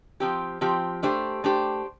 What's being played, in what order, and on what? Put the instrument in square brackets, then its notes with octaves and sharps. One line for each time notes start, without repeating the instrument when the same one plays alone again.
[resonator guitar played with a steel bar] F3 C4 G4
F3 C4 G4
A3 D4 G4 C5
A3 D4 G4 C5